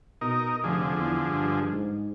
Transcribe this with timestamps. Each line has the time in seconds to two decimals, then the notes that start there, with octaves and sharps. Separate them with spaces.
0.21 B2 D#4 A#4
0.64 F1 D3 F3 G#4
0.98 E2
1.28 G2
1.72 G#2